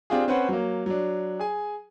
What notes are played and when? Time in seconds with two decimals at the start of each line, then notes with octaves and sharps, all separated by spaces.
0.10 C4 D4 F4 G4 G#4
0.28 C4 C#4 B4 C5 F#5
0.49 F#3 A#3
0.86 F#3 D4
1.39 G#4 G#5